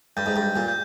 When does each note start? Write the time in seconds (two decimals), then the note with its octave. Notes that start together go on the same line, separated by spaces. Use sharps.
0.17 G2 G6
0.26 G#2
0.36 G2
0.42 G6
0.56 A#2
0.68 G6